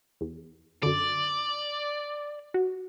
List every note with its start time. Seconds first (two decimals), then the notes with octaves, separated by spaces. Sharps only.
0.21 E2
0.83 F#2 D3 D5
2.54 F#4